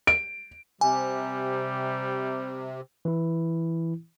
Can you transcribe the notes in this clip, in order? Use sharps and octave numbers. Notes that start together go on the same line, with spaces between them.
D7
C3 G3 G#5
E3 E4